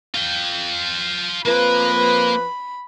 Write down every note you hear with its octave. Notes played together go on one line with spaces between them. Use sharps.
F4 G5
F2 F3 A#3 B4 B5